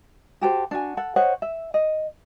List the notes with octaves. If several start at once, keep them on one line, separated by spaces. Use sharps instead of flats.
F#4 G4 A4 C5
D4 F#4 G#5
A4 F#5
C5 C#5 D#5 F#5
E5
D#5